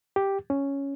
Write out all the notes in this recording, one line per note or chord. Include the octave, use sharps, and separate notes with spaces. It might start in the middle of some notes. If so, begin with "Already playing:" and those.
G4
C#4